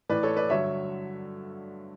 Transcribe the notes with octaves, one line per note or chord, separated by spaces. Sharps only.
A2 E3 B4 D5
A4 C#5
B4 D5
G2 D3 F#3 C#5 E5